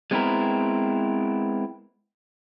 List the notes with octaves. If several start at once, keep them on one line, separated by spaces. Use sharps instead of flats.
G#3 B3 C4 D4 E4 A#4